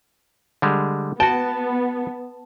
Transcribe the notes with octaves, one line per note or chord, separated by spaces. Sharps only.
D3 G3 G#3
B3 F#4 G5 A5